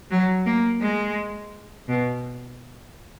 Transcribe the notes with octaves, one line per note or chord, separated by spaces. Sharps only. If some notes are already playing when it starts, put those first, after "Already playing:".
F#3
A#3
G#3
B2